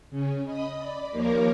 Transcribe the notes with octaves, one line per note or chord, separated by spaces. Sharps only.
C#3 C#4
D#5 B5 D#6
D5 B5
D#2 F3 A#3 A#4 C#5 D6